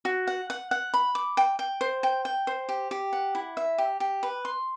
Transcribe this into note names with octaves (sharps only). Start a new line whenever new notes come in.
F#4
F#5
F#5
F#5
B5
D6
G5
G5
C5
G5
G5
C5
G4
G4
F#5
E4
E5
G4
G4
B4
C6